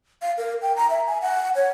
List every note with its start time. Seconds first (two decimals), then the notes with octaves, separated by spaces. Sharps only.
0.22 F5
0.38 A#4
0.62 G5
0.76 A#5
0.90 E5
1.07 G#5
1.22 F#5
1.56 C#5